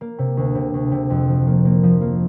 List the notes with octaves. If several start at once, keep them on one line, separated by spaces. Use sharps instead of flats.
A#3
C3
D2
C3
D2
C3
F2
F3
A#3
A#3
F3
A#3